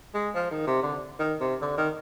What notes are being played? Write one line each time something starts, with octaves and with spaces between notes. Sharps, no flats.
G#3
F3
D#3
C3
D3
D#3
C3
D3
D#3